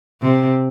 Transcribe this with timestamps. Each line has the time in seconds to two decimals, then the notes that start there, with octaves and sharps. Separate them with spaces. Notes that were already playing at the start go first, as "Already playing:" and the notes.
0.21 C3